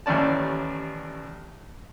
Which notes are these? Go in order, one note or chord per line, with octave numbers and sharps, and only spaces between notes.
A1 D#2 A2 C#4 D5 A5